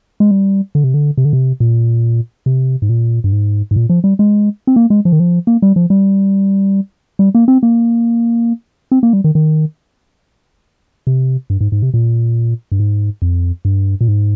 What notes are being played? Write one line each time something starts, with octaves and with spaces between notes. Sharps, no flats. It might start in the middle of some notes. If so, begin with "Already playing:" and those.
G#3
G3
D3
C3
D3
C3
D3
C3
A#2
C3
G#2
A#2
G2
G#2
G#2
A#2
F3
G3
G#3
C4
A#3
G#3
F3
D#3
F3
A#3
G3
F3
G3
G3
A#3
C4
A#3
C4
A#3
G3
D#3
D#3
C3
G2
G#2
G#2
C3
A#2
G2
G#2
F2
G2
A#2
G#2